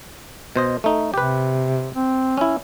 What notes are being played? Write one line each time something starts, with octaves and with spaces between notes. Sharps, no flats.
B2 C5 D#5
A3 D#4
C3 G4 B4
C4
C#4 E4